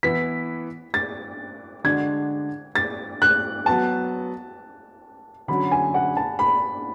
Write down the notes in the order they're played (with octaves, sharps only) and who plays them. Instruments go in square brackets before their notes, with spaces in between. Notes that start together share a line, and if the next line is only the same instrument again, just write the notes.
[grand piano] E3 B3 E4 [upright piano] B6
[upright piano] A6
[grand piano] D3 G#3 D4 F#4 [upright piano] G#6
[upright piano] A6
F#6
[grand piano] F#3 B3 F#4 [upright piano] A5
[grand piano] D3 F#3 C#4 F#4 [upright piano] B5
[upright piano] G#5
F#5
A5
B5